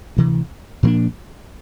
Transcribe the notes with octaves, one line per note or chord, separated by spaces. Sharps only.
D2 C3 E3
A#2 F3 A#3 D4